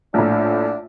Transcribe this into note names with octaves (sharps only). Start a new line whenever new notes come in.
A#1 A2 D4